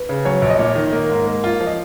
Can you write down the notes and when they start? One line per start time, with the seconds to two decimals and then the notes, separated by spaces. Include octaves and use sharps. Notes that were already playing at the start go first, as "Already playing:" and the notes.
Already playing: B4
0.09 C#3
0.25 F#3 C#5
0.42 A#1
0.50 D#5
0.59 A#2
0.76 D#3
0.93 A#3
1.10 G#2
1.27 A#3
1.44 F4
1.60 F3
1.66 D#5